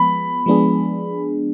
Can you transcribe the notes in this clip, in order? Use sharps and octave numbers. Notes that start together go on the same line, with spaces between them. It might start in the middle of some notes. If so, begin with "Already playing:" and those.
Already playing: F3 G#3 B3 B5
F3 G#3 B3 D4 G#4